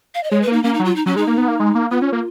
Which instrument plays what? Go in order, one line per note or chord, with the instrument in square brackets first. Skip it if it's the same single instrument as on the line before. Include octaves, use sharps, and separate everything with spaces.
[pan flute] F5
D#5
[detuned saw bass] G#3 [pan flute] C#5
[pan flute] B4
[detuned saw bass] A#3
[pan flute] D#4
[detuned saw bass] A#3 [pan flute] C#4
[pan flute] D#4
[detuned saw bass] F#3
[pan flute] F4
D#4
[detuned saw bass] F#3 [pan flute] C#4
[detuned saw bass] G#3 [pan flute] D#4
[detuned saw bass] A#3
B3
A#3
G#3
A#3
[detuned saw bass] B3 [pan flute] F4
[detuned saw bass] C#4
A#3